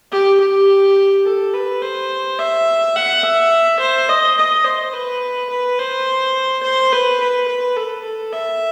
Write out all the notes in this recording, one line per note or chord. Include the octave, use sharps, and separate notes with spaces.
G4
G4
A4
B4
C5
E5
F#5
E5
C5
D#5
D#5
C5
B4
B4
C5
C5
B4
B4
B4
A4
A4
E5